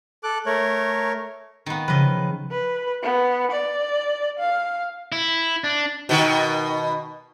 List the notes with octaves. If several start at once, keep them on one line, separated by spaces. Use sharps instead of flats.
A4 D6 F#6
A3 A#4 C#5
D#3 B3
C#3 F3 B4 D#5
B4
B3
D5
F5
E4
D4
B2 D#3